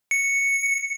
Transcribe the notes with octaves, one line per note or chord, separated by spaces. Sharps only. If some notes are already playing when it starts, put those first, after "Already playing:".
C#7